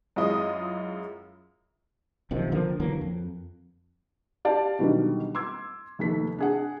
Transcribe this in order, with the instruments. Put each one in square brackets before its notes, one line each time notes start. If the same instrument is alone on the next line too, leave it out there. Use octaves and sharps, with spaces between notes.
[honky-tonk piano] F#2 G#3 E4 F4 D#5 D#6
[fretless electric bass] B1 C3 D#3 F3
D3 F3 A#3
D3 E3 F#3 A#3
F2
[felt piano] G4 D5 F5 A5
B2 D3 D#3 F#3 G3
C6 D6 E6 G#6
F1 D#2 A4 B6
D4 G#4 F#5